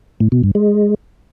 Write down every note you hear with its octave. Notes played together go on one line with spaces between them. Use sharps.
A2
B2
G2
G#3